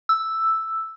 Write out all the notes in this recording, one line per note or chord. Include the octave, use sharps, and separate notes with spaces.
E6